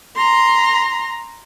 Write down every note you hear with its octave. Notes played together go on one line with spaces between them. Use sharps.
A#5 C6